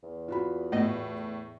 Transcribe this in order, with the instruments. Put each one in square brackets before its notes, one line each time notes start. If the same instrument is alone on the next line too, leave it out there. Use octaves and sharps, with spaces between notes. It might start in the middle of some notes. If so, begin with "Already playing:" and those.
[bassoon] E2
[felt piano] F4 F#4 B5
[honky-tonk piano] A2 [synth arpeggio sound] A3 B3 D#5